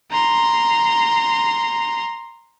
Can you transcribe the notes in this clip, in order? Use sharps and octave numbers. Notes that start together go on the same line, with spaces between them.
A#5 C6